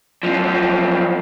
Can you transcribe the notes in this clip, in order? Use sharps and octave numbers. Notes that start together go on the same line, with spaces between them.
F#2 F3